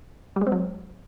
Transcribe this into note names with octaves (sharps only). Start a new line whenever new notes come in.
G3
G#3
C4
F#3